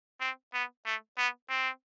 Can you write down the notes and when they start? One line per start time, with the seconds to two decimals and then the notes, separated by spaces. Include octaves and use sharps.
0.20 C4
0.54 B3
0.85 A3
1.18 B3
1.50 C4